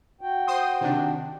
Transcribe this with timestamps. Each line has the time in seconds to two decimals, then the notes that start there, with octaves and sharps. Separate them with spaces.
0.21 F#4 G5
0.48 C5 C6 D#6
0.81 C3 D#3 D4